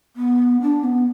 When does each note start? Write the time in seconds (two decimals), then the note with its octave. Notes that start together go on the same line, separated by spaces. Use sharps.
0.16 B3
0.61 D4
0.84 B3